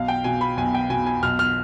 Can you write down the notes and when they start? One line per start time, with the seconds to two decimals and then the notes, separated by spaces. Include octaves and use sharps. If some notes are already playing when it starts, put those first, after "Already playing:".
Already playing: B1 F5
0.08 G5
0.24 B2 G#5
0.41 B5
0.57 B1 G#5
0.74 G5
0.90 B2 G#5
1.06 G#5
1.23 B1 F6
1.39 F6